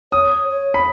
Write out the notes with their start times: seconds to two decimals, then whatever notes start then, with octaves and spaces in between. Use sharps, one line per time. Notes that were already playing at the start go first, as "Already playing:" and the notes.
0.12 C#5 D#6
0.49 C#5
0.74 B5